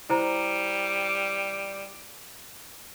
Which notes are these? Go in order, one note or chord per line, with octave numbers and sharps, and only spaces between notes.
G3 E4 C5 A#5